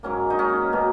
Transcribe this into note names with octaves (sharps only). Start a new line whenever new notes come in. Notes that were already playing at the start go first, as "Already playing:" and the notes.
G#2 F#3 A#3 C#4
D#4
C#4
B2 A#3